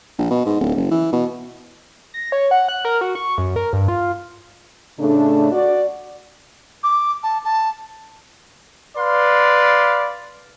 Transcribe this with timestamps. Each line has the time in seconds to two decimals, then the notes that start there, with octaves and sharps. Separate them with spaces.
0.19 A#1
0.31 B2
0.46 G#2
0.60 D1
0.76 F#1
0.91 E3
1.13 B2
2.14 A#6
2.32 C#5
2.51 F#5
2.68 F#6
2.85 A#4
3.01 F#4
3.15 C#6
3.38 F#2
3.56 A#4
3.73 G2
3.88 F4
5.00 A2 C#3 A3 D4
5.52 F#4 D5
6.84 D6
7.23 A5
7.45 A5
8.97 B4 D5 F5 C6